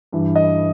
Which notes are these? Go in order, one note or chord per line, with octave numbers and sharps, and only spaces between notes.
G2 E3
D#5